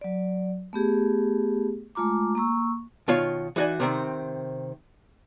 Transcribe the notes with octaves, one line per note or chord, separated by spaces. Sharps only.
F#3 D5
A3 B3 G4 G#4
G#3 A3 F4 A#5 D6
A#3 A#5 C#6 E6
B2 D#3 F4 C#5 F5
E3 D#4 F#4 D5 G#5
C3 D#3 C4